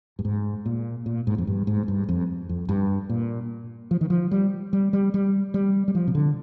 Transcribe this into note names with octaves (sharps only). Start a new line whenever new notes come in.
G2
G#2
A#2
A#2
G#2
F2
G2
G#2
G2
F2
F2
G2
A#2
F3
D#3
F3
G3
G3
G3
G3
G3
G3
F3
C3
D3